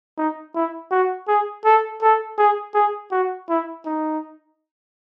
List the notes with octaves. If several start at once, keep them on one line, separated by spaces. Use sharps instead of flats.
D#4
E4
F#4
G#4
A4
A4
G#4
G#4
F#4
E4
D#4